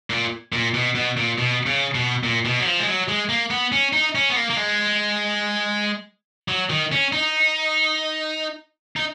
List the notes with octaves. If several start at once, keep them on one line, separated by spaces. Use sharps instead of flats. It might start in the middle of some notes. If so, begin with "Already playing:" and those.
A#2
A#2
B2
B2
A#2
B2
C#3
B2
A#2
B2
F#3
F3
G#3
F#3
G#3
A#3
B3
C#4
D#4
C#4
B3
A#3
A#3
G#3
F#3
D#3
C#4
D#4
D#4